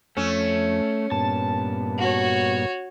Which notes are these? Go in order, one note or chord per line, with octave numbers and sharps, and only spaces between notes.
F2 A3 C#4
G2 A#2 B3 A5
F#4 C#5